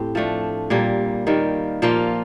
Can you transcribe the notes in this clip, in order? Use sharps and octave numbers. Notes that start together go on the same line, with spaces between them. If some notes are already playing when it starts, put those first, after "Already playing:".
Already playing: A2 C4 G4
F3 A3 D4
A#2 G3 A#3
D#3 G3 A#3
A#2 F3 A#3 F4